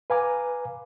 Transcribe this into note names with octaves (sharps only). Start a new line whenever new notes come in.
B4 F5 G#5 A#5 D6